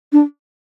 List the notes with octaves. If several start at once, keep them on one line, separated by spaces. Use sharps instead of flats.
D4